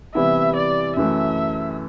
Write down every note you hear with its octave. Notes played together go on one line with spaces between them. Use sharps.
C3 E3 G3 B3 E4 E5
D5
F#2 E3 A3 E5